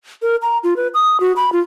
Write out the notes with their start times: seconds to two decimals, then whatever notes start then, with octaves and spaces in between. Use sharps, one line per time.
0.22 A#4
0.42 A#5
0.64 F4
0.76 B4
0.94 D#6
1.20 F#4
1.36 B5
1.52 F4